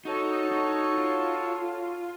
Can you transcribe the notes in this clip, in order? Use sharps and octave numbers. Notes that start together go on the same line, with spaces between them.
D#4 F#4 A4 C#5 A5
D#4
F4